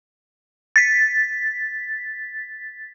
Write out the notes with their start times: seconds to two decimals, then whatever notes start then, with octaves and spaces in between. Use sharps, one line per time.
0.76 A6 B6